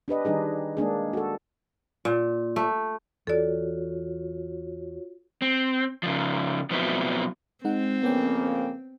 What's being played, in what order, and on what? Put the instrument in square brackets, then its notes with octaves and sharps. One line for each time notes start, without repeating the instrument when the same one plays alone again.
[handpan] D4 G4 B4 D#5
D#3 G3 D4 D#4 G#4
G#3 A#3 D4 G#4
F#4 A4
[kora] A#2
A3
[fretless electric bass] E2 E3 [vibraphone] F4 F#4 C#5 [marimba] A4 D5
[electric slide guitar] C4
C#3 F3
B2 F3 F#3 B3 C4 E4
[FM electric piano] G#3 D#4 F#5 [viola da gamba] C4
[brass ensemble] F2 C#3 A#3 [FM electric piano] B3 C#4 G5